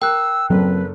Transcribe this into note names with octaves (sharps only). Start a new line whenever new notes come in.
A#4 G5 E6 F#6
F#1 F#3 C4 A4 B4